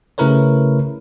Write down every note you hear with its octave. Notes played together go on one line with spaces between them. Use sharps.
C#3 A3 E4 A#4 B4 C#5